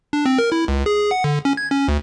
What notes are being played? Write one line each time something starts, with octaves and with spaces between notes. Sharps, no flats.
D4
C4
A#4
E4
C#2
G#4
F#5
D3
C#4
G#6
C#4
D2